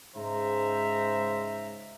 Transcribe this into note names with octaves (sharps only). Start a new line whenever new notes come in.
G#2 C#3 G#3 C5 E5 A#5